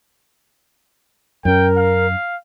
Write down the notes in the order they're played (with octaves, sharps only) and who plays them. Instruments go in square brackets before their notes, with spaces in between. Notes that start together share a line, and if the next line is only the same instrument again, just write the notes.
[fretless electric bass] F#2 C#4 [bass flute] A#4 [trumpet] G5
[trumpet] F5